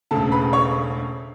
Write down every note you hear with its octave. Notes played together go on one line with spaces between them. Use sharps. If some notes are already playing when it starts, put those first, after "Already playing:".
E1 D2 C#3 A4 A5
B4 B5
C#5 C#6